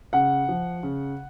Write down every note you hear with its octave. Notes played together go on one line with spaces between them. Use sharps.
C#3 F#5
F3
C#3